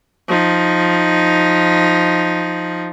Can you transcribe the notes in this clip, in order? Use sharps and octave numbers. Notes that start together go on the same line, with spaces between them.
F3 D#4